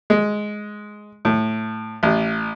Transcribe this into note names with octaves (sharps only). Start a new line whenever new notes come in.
G#3
A2
A1